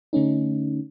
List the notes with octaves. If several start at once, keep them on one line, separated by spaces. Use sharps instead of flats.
D3 A3 C#4 D#4